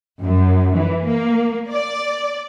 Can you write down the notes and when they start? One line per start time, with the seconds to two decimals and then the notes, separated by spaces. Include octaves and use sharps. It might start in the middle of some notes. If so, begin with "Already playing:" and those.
0.21 F#2
0.74 E3
1.05 A#3
1.70 D5